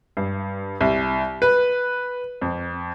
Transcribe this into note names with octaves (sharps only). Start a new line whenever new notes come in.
G2
C2
B4
F2